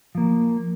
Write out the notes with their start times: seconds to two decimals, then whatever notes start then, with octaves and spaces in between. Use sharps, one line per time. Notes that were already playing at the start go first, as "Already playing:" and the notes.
0.15 F3 A#3